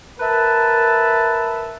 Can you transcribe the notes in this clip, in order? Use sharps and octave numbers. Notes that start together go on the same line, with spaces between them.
A#4 B4 E5 A5